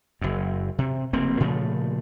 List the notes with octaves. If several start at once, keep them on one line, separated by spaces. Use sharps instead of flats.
F#1 F#2
C3
F1 C#3 A#3 C4
A#2 C#3 F3 A3